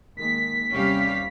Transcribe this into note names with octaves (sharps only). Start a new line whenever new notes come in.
D#3 G#3 A#3 B6
D#2 C3 G3 C#4 G4 F5